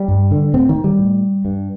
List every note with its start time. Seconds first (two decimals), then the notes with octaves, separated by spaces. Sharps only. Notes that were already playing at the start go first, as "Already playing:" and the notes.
Already playing: G3
0.08 G2
0.31 D3
0.54 A2 C4
0.69 D#3
0.84 G3
0.99 A2
1.45 G2